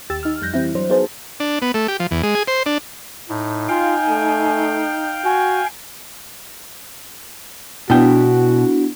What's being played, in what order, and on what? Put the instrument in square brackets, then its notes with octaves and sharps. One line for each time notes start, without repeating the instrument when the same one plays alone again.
[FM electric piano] D#2 G4 E6 A6
D#4 F6
F2 G3 F#6 G6 A#6
E3 G3 C4 E4
F#3 D4 C5
B3 D#4 F#4 G#4 C5 A5
[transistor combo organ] D4
B3
A3
G4
F3
E2
G#3
G#4
C5
D4
[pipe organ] A2 [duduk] D#4
[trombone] F4 [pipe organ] F5 G5 [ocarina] G#5
[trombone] A3
[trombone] F#4 [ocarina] G#5
[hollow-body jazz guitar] B2 G5 [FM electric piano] B3 D4 E4 [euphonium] F#4